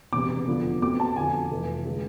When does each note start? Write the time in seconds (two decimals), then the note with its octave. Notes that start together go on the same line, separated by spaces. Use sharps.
0.13 E1 E2 C3 D6
0.47 F2 D3 F3 B3 D4
0.82 E2 B2 A3 C4 D6
1.00 A5
1.16 F2 D3 F3 G#5
1.51 F1 F2 E3 A3
1.85 D3 G#3